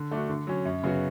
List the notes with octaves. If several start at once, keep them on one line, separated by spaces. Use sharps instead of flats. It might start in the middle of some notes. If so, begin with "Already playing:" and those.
Already playing: D3
A3 D4 F#4
D3
F#3 C#4
F#2
C#3 F#3 B3 F#4